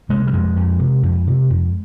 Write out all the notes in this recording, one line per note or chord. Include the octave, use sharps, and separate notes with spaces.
C3 G#3
G3
F2 G#3
F2
C3
F2
C3
F2